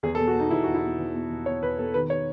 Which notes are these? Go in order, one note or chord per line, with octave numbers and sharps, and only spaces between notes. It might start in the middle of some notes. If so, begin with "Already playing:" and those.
E2 G#4
A4
B2
F#4
B2 D#4
E2 E4
F#4
E2
E4
B2
E2
B2
E2
B2 C#5
E2 B4
B2 A4
D#3 B4
C#5